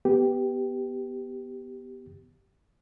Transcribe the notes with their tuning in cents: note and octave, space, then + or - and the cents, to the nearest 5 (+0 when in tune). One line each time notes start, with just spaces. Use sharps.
B3 +0 G4 -5